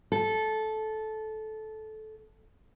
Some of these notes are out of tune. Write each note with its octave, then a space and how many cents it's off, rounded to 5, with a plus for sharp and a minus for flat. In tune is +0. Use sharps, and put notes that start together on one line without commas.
A4 -15